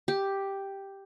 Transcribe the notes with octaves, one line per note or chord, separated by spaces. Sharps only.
G4